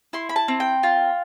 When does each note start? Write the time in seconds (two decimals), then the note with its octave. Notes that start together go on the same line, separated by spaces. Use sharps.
0.13 E4 C6
0.29 B5
0.36 A5
0.48 C4
0.60 G5
0.83 F4